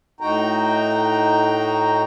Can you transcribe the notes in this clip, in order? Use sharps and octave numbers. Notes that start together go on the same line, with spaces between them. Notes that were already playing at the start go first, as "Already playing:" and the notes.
A2 D#4 F#4 G5 A#5